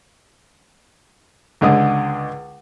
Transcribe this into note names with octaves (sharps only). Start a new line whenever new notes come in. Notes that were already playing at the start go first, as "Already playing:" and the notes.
C#2 D3 G#3 D#6